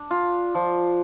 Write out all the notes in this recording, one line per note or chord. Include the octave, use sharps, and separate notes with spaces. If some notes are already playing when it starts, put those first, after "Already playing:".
Already playing: D4
F4
F3